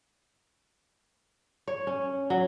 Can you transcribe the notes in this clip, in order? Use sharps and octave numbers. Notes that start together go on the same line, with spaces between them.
C#5
C#4
F#3